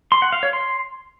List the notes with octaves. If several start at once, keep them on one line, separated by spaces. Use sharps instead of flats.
C6
F#5
F5
C#5
C6